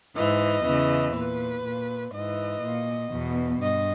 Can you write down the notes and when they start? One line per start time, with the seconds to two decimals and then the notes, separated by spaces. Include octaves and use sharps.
0.15 G#2 E3 D#5
0.65 E2 C#3 E3
1.14 A#2 B4
1.64 A#2
2.13 G#2 E3 D#5
2.62 A#2
3.12 E2 B2
3.61 G2 D#5